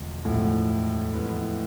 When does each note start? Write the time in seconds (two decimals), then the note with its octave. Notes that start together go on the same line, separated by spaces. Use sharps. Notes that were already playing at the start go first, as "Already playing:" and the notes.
Already playing: E1 D2 D3 F3 G#3
0.25 E1 D2 A2 D3 F3 G#3
1.13 F2 E3 G#3 B3